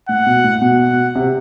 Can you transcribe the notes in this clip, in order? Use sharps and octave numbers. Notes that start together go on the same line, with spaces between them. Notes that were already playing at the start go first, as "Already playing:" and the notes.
A2 F#5
B2
A2
B2 F#5
C3